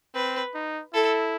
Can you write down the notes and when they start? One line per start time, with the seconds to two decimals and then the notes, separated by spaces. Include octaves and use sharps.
0.15 C4 B4
0.55 D#4
0.94 E4 A4